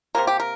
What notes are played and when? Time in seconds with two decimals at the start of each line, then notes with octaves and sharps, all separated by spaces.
0.15 C3 G3 A#3 A#4
0.27 G4
0.40 A#4